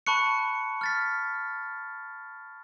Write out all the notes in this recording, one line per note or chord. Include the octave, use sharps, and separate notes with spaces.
A5 B5 C#6 F#6 C#7
F6 A6 B6